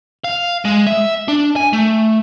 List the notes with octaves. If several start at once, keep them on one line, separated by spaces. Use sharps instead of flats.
F5
G#3
E5
D4
G#5
A3